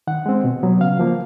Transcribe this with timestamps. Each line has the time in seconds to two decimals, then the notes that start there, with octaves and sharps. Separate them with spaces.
0.07 D#3 F#5
0.26 G#3 C4
0.44 B2
0.63 F#3 B3
0.81 C#3 F5
0.99 F3 A#3